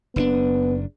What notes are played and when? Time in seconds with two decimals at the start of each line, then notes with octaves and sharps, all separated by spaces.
0.16 F#1 B3 C4 D4